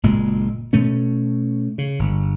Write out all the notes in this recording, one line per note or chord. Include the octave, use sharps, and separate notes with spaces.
F#1 A#2 G#3
B2 A3 C#4
C#3
G1